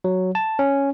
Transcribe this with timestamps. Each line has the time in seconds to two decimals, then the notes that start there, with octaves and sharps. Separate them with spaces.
0.04 F#3
0.35 A5
0.59 C#4